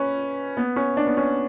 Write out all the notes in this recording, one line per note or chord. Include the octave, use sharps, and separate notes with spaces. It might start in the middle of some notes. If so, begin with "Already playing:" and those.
Already playing: C#4 B4
B3
C#4
D4
B3
C#4